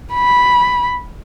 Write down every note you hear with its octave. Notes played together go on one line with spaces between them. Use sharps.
B5